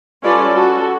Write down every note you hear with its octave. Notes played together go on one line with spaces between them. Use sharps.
G3 C#4 F4 A4 B4 D5
F#4 A4